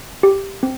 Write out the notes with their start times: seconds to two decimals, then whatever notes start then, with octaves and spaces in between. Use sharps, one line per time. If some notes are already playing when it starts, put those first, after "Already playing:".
0.23 G4
0.63 C4